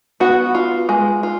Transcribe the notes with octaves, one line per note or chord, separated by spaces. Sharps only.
B3 F#4
F4
G#3
F4